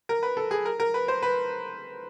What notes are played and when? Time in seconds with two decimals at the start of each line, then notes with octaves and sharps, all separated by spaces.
0.09 A#4
0.23 B4
0.37 A4
0.51 G#4
0.65 A#4
0.80 A#4
0.94 B4
1.08 C5
1.22 B4